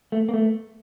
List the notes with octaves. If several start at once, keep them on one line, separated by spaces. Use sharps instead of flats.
A3
A#3
A3